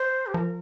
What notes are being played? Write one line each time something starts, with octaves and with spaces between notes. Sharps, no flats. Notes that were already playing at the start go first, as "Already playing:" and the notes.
Already playing: C5
G4
F3 A#4